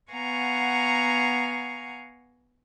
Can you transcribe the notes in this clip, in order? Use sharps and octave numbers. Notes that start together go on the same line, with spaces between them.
B3 F5 F#5 G#5 A#5 C#6